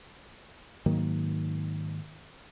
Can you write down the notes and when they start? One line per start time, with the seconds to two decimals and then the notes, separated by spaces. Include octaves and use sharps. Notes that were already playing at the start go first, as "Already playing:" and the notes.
0.86 G#2 D#3 F#3 A#3